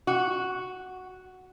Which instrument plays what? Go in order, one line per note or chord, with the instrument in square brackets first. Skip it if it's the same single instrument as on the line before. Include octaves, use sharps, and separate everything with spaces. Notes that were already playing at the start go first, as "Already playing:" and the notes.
[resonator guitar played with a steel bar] F#4